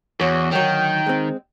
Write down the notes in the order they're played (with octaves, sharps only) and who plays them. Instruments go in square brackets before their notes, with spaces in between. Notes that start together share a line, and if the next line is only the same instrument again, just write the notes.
[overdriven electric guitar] E2 [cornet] F#4 [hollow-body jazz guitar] C#5
[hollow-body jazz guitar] D2 F#3 [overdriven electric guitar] D#3 [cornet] G5
[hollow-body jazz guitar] G#3 C4